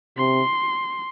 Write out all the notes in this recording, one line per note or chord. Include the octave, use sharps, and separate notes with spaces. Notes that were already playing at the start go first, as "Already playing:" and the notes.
C3 C6